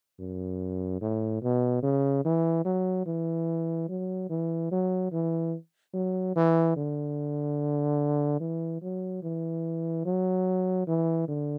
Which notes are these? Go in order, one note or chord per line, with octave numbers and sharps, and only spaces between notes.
F#2
A2
B2
C#3
E3
F#3
E3
F#3
E3
F#3
E3
F#3
E3
D3
E3
F#3
E3
F#3
E3
D3